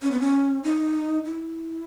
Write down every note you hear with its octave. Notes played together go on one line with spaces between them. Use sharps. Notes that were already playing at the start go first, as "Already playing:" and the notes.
C#4
B3
C#4
D#4
E4